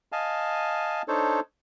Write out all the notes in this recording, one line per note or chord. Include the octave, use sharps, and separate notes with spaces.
D#5 F5 G#5 A5
D4 D#4 A4 C5 C#5